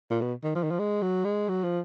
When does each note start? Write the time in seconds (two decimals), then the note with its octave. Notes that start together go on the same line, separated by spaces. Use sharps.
0.10 A#2
0.21 B2
0.44 D#3
0.55 F3
0.63 D#3
0.71 F3
0.79 G#3
1.02 F#3
1.25 G#3
1.49 F#3
1.64 F3